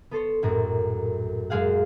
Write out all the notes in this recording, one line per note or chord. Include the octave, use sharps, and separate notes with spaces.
B3 A4 C5 C#5
A#1 F#2 A2 A#4
F#2 G#3 G#4 F5 F#5